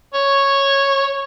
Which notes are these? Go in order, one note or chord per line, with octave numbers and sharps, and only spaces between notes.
C#5